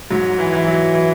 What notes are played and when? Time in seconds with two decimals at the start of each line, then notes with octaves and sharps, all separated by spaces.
0.10 G#2 F#3
0.39 E3
0.53 E3
0.67 F#3
0.94 E3